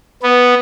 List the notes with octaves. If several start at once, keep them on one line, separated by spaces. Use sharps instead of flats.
B3